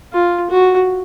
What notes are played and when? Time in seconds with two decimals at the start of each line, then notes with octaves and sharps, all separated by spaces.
0.13 F4
0.51 F#4